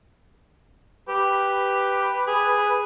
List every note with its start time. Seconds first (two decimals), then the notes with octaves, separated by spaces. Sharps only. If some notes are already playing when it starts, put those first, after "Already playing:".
1.09 G4 B4
2.27 G#4